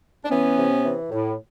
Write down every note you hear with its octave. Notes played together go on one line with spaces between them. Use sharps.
D4
E3 B3 C#4
C3
E3
A2